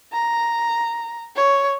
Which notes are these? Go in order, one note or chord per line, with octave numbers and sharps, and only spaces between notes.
A#5
C#5